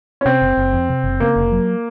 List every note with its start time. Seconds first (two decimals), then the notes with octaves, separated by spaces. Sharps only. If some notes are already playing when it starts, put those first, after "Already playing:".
0.21 C#4
0.25 C3 C4
0.42 F#1
0.57 F#1
0.73 F2
0.89 C3
1.04 F#1
1.20 C#3 A#3
1.36 F1
1.52 F#3